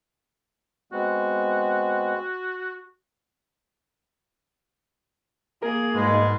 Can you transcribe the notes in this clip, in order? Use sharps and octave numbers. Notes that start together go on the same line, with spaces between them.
G#3 B3 C4 F#4
A#3 G#4 A#4
G#2 B2 G3 G#3